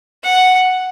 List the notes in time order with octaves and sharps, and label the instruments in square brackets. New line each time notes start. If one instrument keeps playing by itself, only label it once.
[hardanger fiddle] F#5